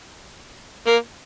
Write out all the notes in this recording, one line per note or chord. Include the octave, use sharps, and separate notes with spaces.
A#3